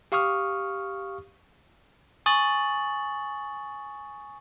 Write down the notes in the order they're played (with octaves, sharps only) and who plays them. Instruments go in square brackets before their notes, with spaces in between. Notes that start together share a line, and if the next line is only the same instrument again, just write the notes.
[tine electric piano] G4 F5 C#6 D#6 F6
[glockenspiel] G#5 C#6 D#6 A6 F#7